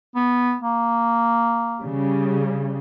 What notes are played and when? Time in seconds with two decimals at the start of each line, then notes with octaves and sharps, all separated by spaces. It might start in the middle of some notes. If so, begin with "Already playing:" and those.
0.15 B3
0.62 A#3
1.82 C#3 G3